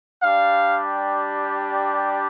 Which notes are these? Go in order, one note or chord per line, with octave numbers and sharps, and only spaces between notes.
G3 D4 G4 F5